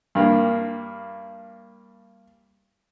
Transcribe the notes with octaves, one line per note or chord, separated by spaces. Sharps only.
G2 A#3